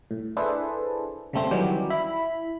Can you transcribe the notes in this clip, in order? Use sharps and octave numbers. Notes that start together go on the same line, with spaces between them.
A2
D4 E4 G#4 A4 B4 C5
C#3 G3 A3 C4
D#3 E3 F#3 G3 C#4 G4
E4 B5